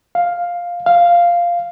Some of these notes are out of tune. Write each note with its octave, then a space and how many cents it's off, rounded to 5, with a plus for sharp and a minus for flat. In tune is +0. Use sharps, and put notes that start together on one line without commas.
F5 +5
F5 -5